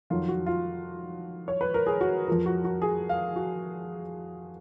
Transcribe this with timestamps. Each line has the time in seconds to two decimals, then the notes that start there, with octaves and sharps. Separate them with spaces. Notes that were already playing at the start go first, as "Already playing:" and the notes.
0.10 F2 D#3 F#3 F4
0.29 F#4
0.46 F4
1.48 C#5
1.61 B4
1.74 A#4
1.87 G#4
2.01 F#4
2.28 F2 F3 A#4
2.46 F#4
2.64 F#4
2.82 G#4
3.09 F5
3.36 F#4